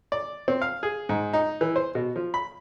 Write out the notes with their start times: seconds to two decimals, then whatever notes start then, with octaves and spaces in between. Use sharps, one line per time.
0.12 D5
0.48 C4
0.62 F5
0.83 G#4
1.09 G#2
1.33 D#4
1.61 E3
1.76 C5
1.95 B2
2.16 F3
2.34 B5